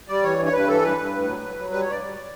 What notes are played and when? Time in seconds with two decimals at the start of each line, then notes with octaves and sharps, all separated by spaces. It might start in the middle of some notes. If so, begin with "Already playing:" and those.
0.09 G3 D5
0.23 E3 C#5
0.38 G2
0.45 C#5
0.53 G2 B4
0.68 E3 A4
0.82 G2 B4
0.97 G2
1.12 A2
1.26 F#3
1.42 F#3
1.56 F#3
1.71 G3 B4
1.81 C#5
1.86 G2 D5
2.00 G3